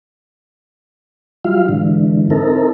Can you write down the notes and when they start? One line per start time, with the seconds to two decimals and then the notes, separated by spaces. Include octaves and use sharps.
1.44 F#3 G3 E4 F4 F5
1.69 G#2 D3 E3
2.30 C4 D#4 E4 A4 A#4